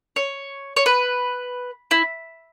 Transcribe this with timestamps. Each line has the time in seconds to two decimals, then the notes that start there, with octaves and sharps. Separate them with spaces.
0.16 C#5
0.76 C#5
0.86 B4
1.91 E4